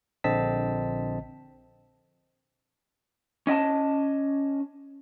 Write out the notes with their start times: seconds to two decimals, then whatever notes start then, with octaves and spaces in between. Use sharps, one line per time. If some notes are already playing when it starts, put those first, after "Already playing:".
0.24 A#1 D3 C4 D#5 A5 B6
3.47 C#4 D#5 G5 A5